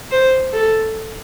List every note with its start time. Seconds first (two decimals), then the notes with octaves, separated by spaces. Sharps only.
0.11 C5
0.53 A4